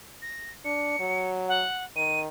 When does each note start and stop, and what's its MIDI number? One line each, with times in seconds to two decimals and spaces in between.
0.22 0.50 94
0.65 0.95 62
0.65 1.27 97
1.00 1.64 54
1.48 1.84 78
1.96 2.28 51
1.96 2.20 99